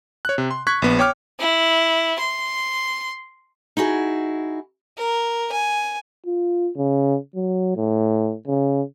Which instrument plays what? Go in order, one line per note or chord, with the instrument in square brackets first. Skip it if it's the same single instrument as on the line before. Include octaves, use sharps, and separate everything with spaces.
[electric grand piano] C#5 F#6
C3
C6
C#6 F#6 G#6 B6
A#1 B3
C#5 G5 D6 F6
[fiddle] E4
C6
[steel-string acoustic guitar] D#4 E4 F#4 G#4
[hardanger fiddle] A#4
G#5
[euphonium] F4
C#3
F#3
A2
C#3